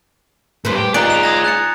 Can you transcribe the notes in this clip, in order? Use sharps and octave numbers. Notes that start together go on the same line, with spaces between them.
A2 G3 B4 C5
G4
D#4 F4 G#4 D5 A#5 F#6
E7 F7
D#6 G#6 A#6
F#6 A6 C#7